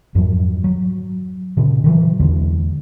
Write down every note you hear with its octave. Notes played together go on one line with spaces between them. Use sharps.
F2 G#2 F3 F#3
F#3
A#2 C#3
D3 E3 F#3
E2 D3 G#3